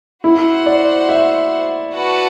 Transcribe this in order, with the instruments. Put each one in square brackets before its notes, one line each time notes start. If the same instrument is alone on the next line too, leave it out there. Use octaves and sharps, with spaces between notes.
[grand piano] E4 [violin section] F#4 C5 F#5
[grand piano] D5
E5
[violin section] F#4 B4 F#5 A5